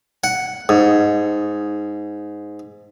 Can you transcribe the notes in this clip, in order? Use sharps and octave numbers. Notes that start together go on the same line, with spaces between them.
F#5
G#2